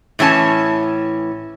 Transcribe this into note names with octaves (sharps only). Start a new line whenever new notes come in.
A2 E3 C#4 F4 A5